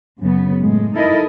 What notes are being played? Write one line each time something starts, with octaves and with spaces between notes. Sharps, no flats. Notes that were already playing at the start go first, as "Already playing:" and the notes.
F#2 C#3 B3
A2 G#3
D#4 E4 A4 A#4 D#5